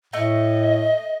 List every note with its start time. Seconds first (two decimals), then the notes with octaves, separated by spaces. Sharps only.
0.13 A2 A3 D#5